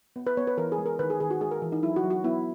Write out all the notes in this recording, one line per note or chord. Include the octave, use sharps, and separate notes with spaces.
B3
B4
B3 C#5
B4
E3 A#4
G#4
G#3
A#4
D#3 B4
G#4
D#3 G#4
F#4
G#3 G#4
A#4
E3
D#4
F#3 E4
F#4
F#3
F#4
B3 E4